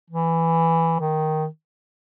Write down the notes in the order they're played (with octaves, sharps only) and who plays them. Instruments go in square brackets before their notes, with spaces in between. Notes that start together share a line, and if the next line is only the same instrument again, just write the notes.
[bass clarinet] E3
D#3